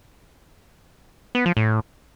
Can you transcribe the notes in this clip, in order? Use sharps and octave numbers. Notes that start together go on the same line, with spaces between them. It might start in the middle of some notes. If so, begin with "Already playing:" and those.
B3
F3
A2